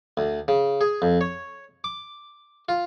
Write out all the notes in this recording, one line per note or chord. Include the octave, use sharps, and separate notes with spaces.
D2
C#3
G#4
F2
C#5
D6
F4